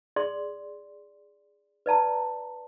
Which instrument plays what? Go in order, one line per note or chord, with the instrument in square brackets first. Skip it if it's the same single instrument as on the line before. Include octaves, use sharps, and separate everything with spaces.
[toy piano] G#4 D5 C6
B4 D5 A5 A#5